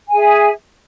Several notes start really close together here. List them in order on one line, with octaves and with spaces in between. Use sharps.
G#5 G#4 E5